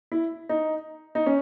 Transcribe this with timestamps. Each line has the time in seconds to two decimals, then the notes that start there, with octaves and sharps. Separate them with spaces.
0.12 E4
0.49 D#4
1.15 D#4
1.26 C#4